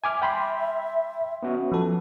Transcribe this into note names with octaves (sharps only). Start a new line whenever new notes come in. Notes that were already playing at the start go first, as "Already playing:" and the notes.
E5 G#5 D6 F6
G5 B5 C6
B3 C#4 F#4
F3 A4